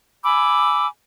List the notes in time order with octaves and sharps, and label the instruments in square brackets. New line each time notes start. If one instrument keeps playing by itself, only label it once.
[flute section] G#5 B5 D6 E6